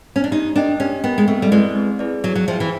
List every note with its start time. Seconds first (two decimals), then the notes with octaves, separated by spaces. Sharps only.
0.16 C#4
0.24 D4
0.31 D#4 G4
0.55 D4 A#4 D#5 G5
0.80 C#4 G4
1.04 B3 A#4 D#5 G5
1.18 G#3
1.28 A3 C4
1.42 G3
1.52 G#3 E4 G#4 B4 D5
1.75 C4
1.99 E4 G#4 B4 D5
2.24 F#3 G#4
2.35 F#3
2.48 F3 C5 E5 G5
2.60 E3